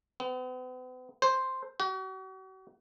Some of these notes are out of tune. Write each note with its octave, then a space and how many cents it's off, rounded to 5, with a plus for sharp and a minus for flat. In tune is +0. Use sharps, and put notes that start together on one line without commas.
B3 +45
C5 +0
F#4 +40